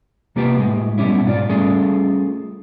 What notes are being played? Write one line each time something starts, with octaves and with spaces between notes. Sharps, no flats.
C3 A#3 F4 G4 B4
A2 G#3
F#2 B2 G3 C#4 E4
G#2 F4 D5
G3 A3 C#4 F4 G#4 A4